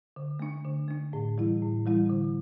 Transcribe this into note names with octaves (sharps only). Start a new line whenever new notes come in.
D3
A3 D4
D3
A3 D4
A2
E3 G3 E4
A2
E3 G3 E4
D3